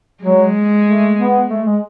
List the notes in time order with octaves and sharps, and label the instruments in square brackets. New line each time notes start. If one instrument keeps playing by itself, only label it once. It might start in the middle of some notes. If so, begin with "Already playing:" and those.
[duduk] F#3 [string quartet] G#3
[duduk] A3
B3
A3
G#3